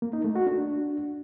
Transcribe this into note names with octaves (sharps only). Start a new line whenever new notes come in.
A#3
D#4
A3
F#4
D4